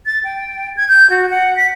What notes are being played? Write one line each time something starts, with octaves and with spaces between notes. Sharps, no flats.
A6
G5
G#6
G6
F#4
F#5
B6